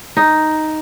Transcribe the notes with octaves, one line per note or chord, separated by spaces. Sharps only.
D#4